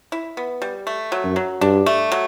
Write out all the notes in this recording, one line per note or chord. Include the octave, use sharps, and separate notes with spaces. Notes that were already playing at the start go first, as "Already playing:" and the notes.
E4
B3
G3
A3
F#3
F#2
F#3
G2 D4
A3
F#3